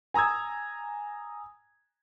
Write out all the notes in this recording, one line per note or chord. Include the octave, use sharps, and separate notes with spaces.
G#5 A#5 D#6 E6 G#6